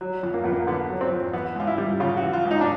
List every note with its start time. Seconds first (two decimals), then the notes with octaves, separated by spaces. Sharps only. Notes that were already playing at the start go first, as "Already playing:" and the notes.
0.01 F#3
0.23 F2
0.34 A#3
0.44 F2 B3
0.53 A#3
0.67 D3 B3
0.89 F#3
1.01 C4
1.11 F2
1.33 E3 B3
1.56 C#2 F4
1.67 E4
1.78 G3
2.00 C#3 F4
2.17 F#4
2.23 E3
2.33 F4
2.45 C#2
2.51 D#4
2.61 D4